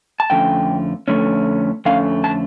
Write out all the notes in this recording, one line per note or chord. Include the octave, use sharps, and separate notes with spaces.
A5
F2 D3 A3 C#4 G5
F2 D3 A3 C#4
F2 D3 A3 C#4 F5
A5